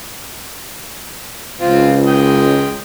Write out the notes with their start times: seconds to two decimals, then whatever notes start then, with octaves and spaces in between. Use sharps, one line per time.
1.61 C#2 C4 F4
2.07 G#3 G5 D#6